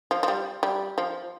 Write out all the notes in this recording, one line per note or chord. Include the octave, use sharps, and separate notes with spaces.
F3
F3
G3
G3
F3